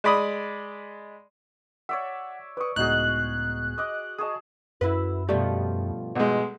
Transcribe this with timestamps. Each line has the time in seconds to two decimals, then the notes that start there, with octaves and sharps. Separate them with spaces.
0.04 G#3 D5 B5 D#6
1.89 C#5 D5 E5 F#5
2.57 B4 D5 C#6 D#6
2.76 C#2 A2 B3 D#4 F#4 G#4 F#6
3.78 D#5 D6
4.18 G#4 D#5 A5 C#6 D#6
4.81 F#2 E4 F#4 B4
5.29 G2 B2 F3 G3 A3
6.16 B1 G#3